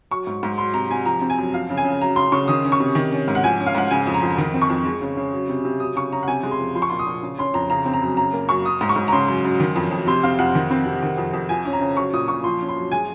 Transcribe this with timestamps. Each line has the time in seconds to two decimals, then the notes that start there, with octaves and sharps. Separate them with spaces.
0.11 F#3 C#6
0.27 G#2
0.43 G#2
0.58 F#3 C6
0.74 C3 A#5
0.90 C3 G#5
1.05 F3 A#5
1.22 C4
1.30 G#5
1.38 F#2
1.54 F3 F5
1.70 C#3
1.77 G#5
1.85 C#3
2.01 F#3 A#5
2.16 C#3 C6
2.32 C#3 C#6
2.48 D#3 D#6
2.65 C#4
2.72 C#6
2.80 C3
2.95 D#3
3.12 C#4
3.28 G#2
3.35 F#5
3.44 F3 G#5
3.60 C#4
3.66 F5
3.75 G#2 F#5
3.91 C#3 G#5
4.07 F2
4.14 A#5
4.23 F2
4.38 D#3
4.54 C4
4.62 C#6
4.70 F2
4.85 G#3
5.02 C#3
5.17 C#3
5.33 F#3
5.49 C3
5.65 C3
5.80 F#3 D#6
5.96 C#3 C#6
6.12 C#3 A#5
6.23 F#5
6.28 C3 G#5
6.43 G#3
6.51 C6
6.59 F2
6.75 F3 C6
6.82 C#6
6.89 A#2 C6
6.99 D#6
7.07 A#2
7.23 C#3
7.38 C#4 C6
7.54 F2 A#5
7.70 C#3 A#5
7.86 C4
7.94 A#5
8.02 F#2
8.17 C#3 A#5
8.33 A#3
8.49 F#2 C#6
8.65 F#3 D#6
8.81 G#2
8.89 C#6
8.96 G#2
9.08 A#5
9.12 C#3 C6
9.28 F#2
9.45 F#2
9.60 D#3
9.76 F2
9.91 F2
10.07 C3 C6
10.23 C4 F5
10.38 F2 F#5
10.55 D#3
10.71 C4
10.86 C3
11.03 D#3
11.18 F2
11.33 F2
11.49 F3 G#5
11.65 C#4
11.73 A#5
11.81 C#3
11.97 F#3 C#6
12.13 A#2 D#6
12.28 A#2 C#6
12.44 F3 C6
12.61 C#4
12.68 C6
12.76 F#2
12.92 G#3 G#5